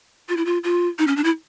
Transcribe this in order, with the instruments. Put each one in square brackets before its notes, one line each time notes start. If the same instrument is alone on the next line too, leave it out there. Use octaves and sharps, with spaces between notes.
[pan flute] F4
E4
F4
F4
D#4
C#4
D4
E4